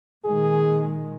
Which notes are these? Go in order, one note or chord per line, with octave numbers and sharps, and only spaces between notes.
A#2 D#3 G#3 G#4